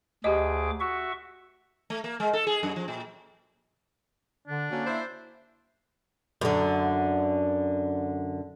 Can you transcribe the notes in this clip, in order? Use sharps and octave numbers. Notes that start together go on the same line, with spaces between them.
D2 G4 G#4 D#5 D6
F#4 E5 C#6
A3
A#3
G#3
A4
G#4
F#2
F3
A#2
D3 D4
D3 A#3 C#4 F#4
E4 C5
F#2 D3